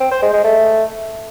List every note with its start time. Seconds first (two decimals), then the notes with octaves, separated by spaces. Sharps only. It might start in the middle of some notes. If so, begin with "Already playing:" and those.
0.01 C4
0.11 C5
0.22 G#3
0.33 G#3
0.44 A3